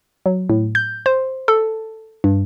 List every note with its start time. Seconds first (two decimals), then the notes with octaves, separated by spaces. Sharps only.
0.26 F#3
0.50 A2
0.75 G6
1.06 C5
1.48 A4
2.24 G2